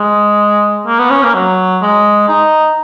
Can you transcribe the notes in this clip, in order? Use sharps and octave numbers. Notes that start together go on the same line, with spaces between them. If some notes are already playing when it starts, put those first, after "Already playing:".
Already playing: G#3
A#3
B3
C#4
A#3
F#3
G#3
D#4